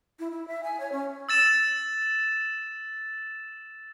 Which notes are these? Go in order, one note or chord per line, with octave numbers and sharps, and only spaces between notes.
E4
E4
E5
G#5
C#5
C#4
E6 A6 E7